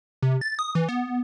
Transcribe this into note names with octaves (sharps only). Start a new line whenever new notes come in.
C3
A6
D#6
E3
B3